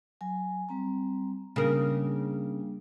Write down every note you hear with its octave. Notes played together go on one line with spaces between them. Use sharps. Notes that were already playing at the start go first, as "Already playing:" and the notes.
F#3 G#5
G3 C4 A#5
C#3 G3 A#3 D4 A#4